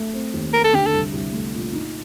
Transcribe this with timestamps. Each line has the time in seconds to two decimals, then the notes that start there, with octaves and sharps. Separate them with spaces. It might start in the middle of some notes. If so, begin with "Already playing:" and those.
Already playing: A3
0.13 C4
0.34 D#2
0.53 A3 A#4
0.64 A4
0.73 D3 G4
0.86 A4
0.93 C2
1.13 C2
1.33 A3
1.54 A#2
1.73 D#4